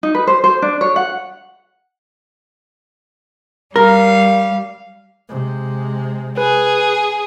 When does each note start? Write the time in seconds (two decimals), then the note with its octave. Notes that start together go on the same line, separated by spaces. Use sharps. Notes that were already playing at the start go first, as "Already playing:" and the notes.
0.03 D#4
0.15 B4
0.27 C5
0.44 C5
0.62 D4
0.81 C#5
0.96 F#5
3.76 G3 A#4 F5
5.29 C3 G#3
6.37 G#4 B4